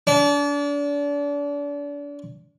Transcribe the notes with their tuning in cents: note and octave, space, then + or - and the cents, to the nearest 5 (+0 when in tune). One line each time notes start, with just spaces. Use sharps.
D4 -35